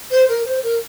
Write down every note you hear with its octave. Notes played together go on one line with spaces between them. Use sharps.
C5
A#4
C5
A#4